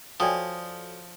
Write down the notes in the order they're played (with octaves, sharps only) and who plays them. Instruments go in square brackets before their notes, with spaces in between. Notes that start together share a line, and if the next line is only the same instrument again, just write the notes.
[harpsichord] F3 [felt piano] F#4 A4 C#5 [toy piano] D5 D#6 [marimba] G5 G#5